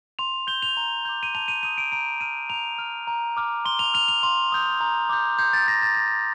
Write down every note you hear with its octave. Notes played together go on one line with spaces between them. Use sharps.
C6 F7
G6 G7
F7
A#5
D6 G6
D#7
A5 F7
D#7
D#6 G6 D#7
D7
A#5 D7
F6 D#7
A#5 F7
F6
A#5
D6 F6
C6 G7
F7
F6 F7
F7
C6
D#6 G6
A#5
D6 G6
C6 G6
A6
G6 A#6
A6
A#5 A#6